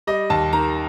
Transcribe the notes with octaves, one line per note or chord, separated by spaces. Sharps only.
G3 D#5
D#2 A5
D#3 A#5